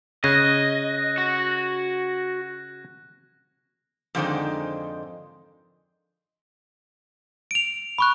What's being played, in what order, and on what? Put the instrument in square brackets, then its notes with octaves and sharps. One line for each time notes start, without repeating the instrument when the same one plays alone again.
[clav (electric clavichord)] C#3 [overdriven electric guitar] D#5 [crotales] F#6 G#6 A#6
[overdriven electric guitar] F#4
[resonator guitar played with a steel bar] F2 G#2 D3 D#3 G#3 C5
[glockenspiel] D7 F7
B5 C#6 F#6